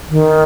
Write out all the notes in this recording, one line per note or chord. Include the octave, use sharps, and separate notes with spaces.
D#3